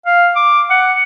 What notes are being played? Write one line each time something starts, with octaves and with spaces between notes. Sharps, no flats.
F5
D6
F#5